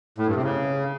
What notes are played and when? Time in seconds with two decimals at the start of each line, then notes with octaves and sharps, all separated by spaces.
0.18 A2
0.27 G2
0.35 C3
0.43 C#3